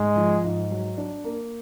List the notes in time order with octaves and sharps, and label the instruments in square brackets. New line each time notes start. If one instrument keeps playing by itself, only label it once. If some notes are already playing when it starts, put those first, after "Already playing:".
Already playing: [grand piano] G#2 [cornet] G#3
[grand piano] F3
G#2
F#3
D4
A#3